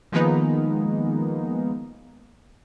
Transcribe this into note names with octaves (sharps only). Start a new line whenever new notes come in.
D#3 F3 G#3 A#3 B3 D#4